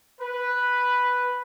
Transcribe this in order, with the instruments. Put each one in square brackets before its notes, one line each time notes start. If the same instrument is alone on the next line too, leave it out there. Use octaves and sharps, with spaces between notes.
[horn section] B4